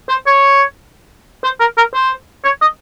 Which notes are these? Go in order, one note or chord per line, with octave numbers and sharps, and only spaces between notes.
C5
C#5
C5
A#4
A#4
C5
C#5
D#5